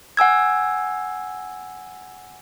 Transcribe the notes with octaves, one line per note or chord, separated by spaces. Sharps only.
F#5 G#5 E6 G#6